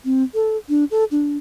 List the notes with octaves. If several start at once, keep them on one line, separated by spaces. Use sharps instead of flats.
C4
A4
D4
A4
D4